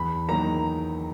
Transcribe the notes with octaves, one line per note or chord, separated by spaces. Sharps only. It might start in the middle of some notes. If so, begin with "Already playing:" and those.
Already playing: E2 B5
D#3 F#3 A#3 A#5